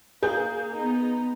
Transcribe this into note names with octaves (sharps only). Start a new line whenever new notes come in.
A#3 G#4 G6
B3 D#4